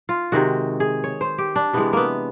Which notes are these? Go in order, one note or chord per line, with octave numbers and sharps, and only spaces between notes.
F4
C3 D#3 G#3 F#4
G#4
C#5
C5
G4
D4
C3 E3 G#3 B3
A#3 B3